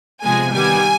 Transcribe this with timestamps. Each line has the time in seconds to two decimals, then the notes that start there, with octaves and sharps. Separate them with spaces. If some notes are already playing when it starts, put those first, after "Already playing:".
0.23 C3 F3 G#3 B3 G#5
0.53 D#3 G3 B3 G#5